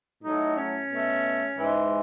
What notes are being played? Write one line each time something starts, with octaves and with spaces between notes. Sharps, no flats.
A2 F#3 A3 D#4
C#4
B2 A3
G#2 E3 G#3